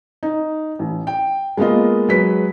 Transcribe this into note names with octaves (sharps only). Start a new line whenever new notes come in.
D#4
A1
G5
G#3 A#3 B3 F4 D#5
F#3 G#3 B4 B6